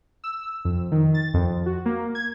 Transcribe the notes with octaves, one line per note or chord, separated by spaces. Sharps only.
E6
F2
D#3
A6
F2
F#4
A#3
G#6